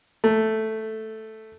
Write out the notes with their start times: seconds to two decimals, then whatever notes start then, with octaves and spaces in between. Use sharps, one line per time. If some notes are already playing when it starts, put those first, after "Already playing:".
0.24 A3